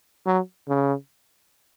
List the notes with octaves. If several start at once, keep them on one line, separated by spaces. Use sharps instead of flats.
F#3
C#3